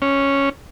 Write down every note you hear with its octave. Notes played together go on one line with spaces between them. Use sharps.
C#4